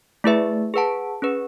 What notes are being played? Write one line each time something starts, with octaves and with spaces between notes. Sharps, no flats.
A3 E4 G#4 B4 E5
G#4 B4 F#5 A5
C#4 G#4 B4